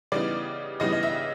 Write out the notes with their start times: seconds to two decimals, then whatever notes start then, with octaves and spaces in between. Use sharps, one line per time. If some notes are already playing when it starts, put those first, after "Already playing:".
0.12 C#3 E3 G3 B3 D#4 D5
0.80 C#3 E3 G3 B3 D#4 D#5
0.92 D#5
1.03 E5